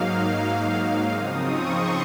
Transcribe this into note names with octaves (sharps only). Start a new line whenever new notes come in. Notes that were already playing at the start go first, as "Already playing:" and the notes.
Already playing: G#2 F#3 A#3 D#4 F5
C#3 F3 C4 D#4 D#6
C#6
C6